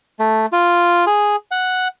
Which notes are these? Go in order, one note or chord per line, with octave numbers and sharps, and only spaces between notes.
A3
F4
G#4
F#5